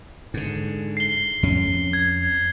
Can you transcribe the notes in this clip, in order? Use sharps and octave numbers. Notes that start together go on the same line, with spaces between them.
G#2 D3
C7 G7
F2 C#4
G#6